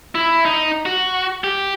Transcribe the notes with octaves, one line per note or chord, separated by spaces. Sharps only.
E4
D#4
F#4
G4